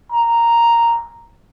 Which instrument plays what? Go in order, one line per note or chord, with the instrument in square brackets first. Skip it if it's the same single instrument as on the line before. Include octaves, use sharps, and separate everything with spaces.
[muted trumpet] A#5